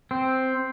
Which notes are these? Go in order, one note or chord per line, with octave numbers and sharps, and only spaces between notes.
C4